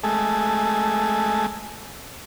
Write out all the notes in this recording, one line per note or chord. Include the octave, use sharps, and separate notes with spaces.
G#3 A3